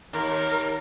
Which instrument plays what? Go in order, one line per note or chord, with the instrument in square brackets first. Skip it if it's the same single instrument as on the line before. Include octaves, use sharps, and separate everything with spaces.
[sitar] D#2 [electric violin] A#4